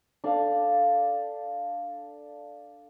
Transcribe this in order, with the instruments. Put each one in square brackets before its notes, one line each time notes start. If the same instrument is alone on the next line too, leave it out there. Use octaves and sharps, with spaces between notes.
[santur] D4 A4 F5